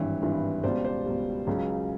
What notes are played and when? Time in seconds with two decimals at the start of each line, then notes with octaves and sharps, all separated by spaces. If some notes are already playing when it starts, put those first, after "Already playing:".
Already playing: G#1 G2 E3 B4 C#5
0.22 G#1 G2 E3
0.63 C#2 B2 G3 C5 D5
0.84 C5 D5
1.06 C#2 B2 G3
1.47 C#2 C#3 F#3